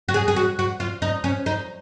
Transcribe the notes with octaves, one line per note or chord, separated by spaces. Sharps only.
F#4
G#4
G#4
F#4
F#4
F4
D#4
C#4
D#4